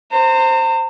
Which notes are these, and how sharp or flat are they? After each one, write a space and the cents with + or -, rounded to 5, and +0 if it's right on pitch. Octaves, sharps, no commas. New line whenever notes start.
C5 +0 A#5 -40